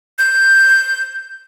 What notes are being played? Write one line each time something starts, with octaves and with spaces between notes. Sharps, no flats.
G6